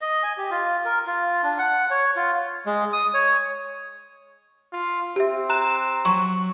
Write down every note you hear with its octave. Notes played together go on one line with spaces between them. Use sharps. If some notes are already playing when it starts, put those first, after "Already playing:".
D#5
G#5
G4
F4
A#4
F4
D4
F#5
C#5
F4
G#3
D#6
C#5
F4
C4 G4 E5
A#5 F#6 E7
F#3 C#6